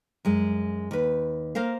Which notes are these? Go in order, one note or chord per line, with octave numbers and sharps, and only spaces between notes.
F#2 G#3
D#2 B4
A#3 A#4 C5 F5